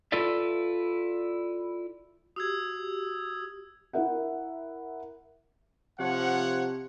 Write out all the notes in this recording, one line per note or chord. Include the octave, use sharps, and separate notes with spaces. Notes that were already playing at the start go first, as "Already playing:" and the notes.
E4 F4 A4 B4 D5 E5
F#4 G4 D#6 E6 G#6
E4 A#4 E5 F#5
C3 F3 C#5 F#5